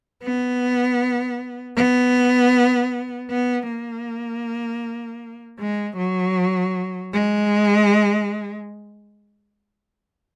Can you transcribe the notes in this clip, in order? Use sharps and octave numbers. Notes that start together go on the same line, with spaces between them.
B3
B3
B3
A#3
G#3
F#3
G#3